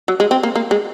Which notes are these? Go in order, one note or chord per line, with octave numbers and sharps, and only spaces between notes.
F#3
G#3
C4
A#3
A#3
G#3